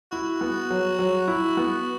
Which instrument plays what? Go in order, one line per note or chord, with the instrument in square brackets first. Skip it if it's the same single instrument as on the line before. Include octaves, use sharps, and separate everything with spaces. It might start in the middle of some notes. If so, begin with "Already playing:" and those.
[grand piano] E4 [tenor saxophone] F#4
[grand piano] B3
F#3
F#3
E4
B3